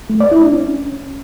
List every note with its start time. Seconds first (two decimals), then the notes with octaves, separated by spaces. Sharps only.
0.10 A3
0.20 D5
0.31 E4
0.42 D4
0.53 C#4